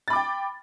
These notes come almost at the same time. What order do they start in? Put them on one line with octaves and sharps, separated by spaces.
A6 B5 D6 G5